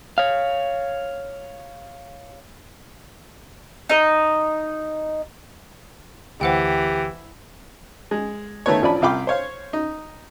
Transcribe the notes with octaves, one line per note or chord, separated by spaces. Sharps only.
C#5 F5
D#4 D#5
D2 E3 G4 C5 F#5 G5
G#3
D#3 A3 B3 C#5
A1 F3 D4 D5 G#5 B5
C2 F4 F5 G5 B5 D6
C5 C#5 F5
D#4